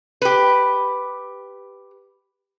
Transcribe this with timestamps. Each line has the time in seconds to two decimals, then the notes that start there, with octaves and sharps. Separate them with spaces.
0.22 G4 B4